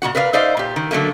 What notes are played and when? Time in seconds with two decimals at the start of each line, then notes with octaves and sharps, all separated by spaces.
0.02 A#2 G3 F#4 F#5
0.15 A#4 B4 D5 D#5 F5
0.33 D#4 C5 D5 E5 F5
0.57 A#2 G4
0.76 D#3
0.91 D3 F#3 G3 A3 A#3